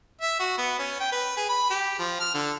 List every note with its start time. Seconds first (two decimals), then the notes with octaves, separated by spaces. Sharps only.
0.22 E5
0.40 F#4
0.58 B3
0.79 C#4
1.00 G5
1.12 B4
1.37 G#4
1.49 B5
1.70 G4
1.99 F3
2.20 F6
2.34 D3